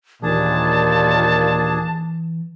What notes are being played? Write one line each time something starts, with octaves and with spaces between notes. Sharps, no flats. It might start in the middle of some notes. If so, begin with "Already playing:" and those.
D#2 A#2 E3 D4 G#4 A5